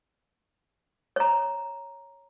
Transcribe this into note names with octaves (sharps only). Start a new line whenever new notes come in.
C#5 A#5